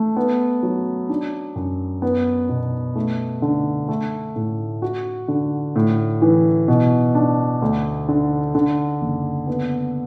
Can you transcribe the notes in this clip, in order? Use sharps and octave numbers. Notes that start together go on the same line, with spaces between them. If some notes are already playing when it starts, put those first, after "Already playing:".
Already playing: A3
B3
F#3
D4
F#2
B3
B2
A3
D3
A3
A2
F#4
D3
A2
E3
B2
D4
D2
D3
D3
F#1
B3